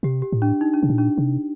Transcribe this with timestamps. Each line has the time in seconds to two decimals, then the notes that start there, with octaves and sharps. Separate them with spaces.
0.03 C3 G4
0.22 G4
0.32 A2
0.42 D4
0.61 D#4
0.74 D4
0.83 C3
0.89 A#2
0.98 D4
1.18 C3